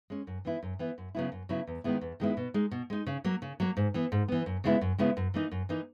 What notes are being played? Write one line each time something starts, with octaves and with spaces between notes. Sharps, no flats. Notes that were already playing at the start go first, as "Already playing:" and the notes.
G#3 C#4
F#2
E3 B3 E4
F#2
E3 B3 E4
F#2
C#3 F#3 B3 E4
F#2
C#3 F#3 B3 E4
E2
D#3 G#3 B3 E4
E2
D#3 G#3 B3 E4
B2
G#3 D#4
B2
G#3 D#4
C#3
F#3 A#3
C#3
F#3 A#3
G#2
E3 B3
G#2
E3 B3
F#2
C#3 G#3 B3 E4
F#2
C#3 G#3 B3 E4
F#2
E3 A#3 D#4
F#2
E3 A#3 D#4